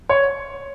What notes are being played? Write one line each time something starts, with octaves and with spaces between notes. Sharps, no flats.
C#5